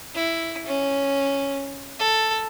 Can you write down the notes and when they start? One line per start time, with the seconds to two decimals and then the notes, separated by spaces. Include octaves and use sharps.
0.14 E4
0.66 C#4
1.99 A4